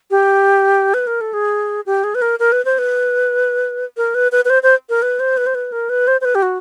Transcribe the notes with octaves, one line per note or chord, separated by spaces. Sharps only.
G4
B4
A#4
A4
G#4
G4
G#4
B4
A#4
A#4
B4
C5
B4
A#4
B4
B4
B4
C5
C5
A#4
B4
C5
B4
C5
B4
A#4
B4
C5
C5
B4
G4
F#4